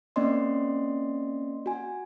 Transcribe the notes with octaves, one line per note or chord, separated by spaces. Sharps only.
A#3 C4 C#4 D5 D#5 C6
F#4 G#5